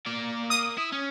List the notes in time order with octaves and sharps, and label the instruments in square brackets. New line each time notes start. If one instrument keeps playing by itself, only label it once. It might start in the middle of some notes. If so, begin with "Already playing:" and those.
[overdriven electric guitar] A#3 D5
[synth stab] D#6
[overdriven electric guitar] E4
C#4